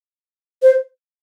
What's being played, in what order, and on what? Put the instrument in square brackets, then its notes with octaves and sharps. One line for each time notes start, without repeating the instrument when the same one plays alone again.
[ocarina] C5